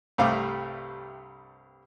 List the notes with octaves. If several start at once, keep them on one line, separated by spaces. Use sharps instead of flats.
C2 G2 C3 A3 F5 D6